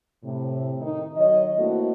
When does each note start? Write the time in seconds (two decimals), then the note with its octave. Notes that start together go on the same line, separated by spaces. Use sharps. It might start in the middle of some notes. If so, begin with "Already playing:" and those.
0.23 A2 C3
0.81 D#3 D#4
1.16 D#3 F#3 C#5 D#5
1.58 A3 A#3 C4 D4 E4 F#4